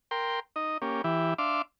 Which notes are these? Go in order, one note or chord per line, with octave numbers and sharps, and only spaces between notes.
A#4 G5 C6
D#4 D#5
A#3 C#4 G4
E3 E4 G4
D4 E5 F5 C6 D6